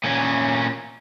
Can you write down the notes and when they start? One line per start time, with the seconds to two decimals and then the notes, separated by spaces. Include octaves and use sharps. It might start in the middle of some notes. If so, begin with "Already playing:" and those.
0.04 A#2 C#4